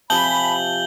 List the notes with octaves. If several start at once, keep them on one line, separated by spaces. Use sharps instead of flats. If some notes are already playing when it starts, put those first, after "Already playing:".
C3 F3 G#5 A5 B5 G6 F#7 G7